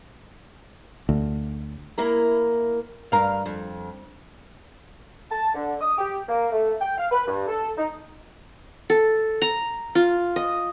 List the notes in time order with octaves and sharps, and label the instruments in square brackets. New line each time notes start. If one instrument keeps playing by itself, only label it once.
[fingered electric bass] D2
[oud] A#3 E4 A#4
G2 A#4 F5
F2
[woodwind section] A5
D3
D#6
G4
A#3
A3
G5
F5
B4
G2
A4
D#4
[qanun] A4
A#5
F4
D#5